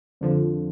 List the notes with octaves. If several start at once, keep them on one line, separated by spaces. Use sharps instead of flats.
F2 D3 F3